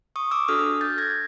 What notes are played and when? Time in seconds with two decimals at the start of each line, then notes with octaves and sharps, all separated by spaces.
0.16 C#6 D#6
0.31 D6 E6
0.48 D4 F#4 A4 D#6 F6
0.81 G6 A6
0.98 G#6 A#6